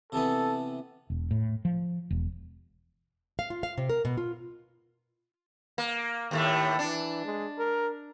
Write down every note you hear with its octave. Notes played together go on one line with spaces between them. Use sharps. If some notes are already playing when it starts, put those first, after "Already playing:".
C3 E3 B3 A4
E1
A2
F3
E1
F5
F4
F5
C3
A#4
B2
F4
A#3
D#2 A2 A3
E3 D4
G#3
A#4